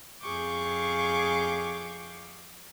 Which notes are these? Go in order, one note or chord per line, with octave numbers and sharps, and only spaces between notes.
F2 G#4 F5 C#6 D6 G6